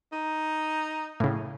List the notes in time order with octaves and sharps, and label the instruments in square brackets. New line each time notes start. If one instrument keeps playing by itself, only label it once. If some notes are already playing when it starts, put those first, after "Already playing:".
[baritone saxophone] D#4
[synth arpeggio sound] A2 C#3